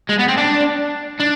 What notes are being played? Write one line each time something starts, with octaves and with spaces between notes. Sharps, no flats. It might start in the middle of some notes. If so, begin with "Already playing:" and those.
G#3
B3
C4
D4
D4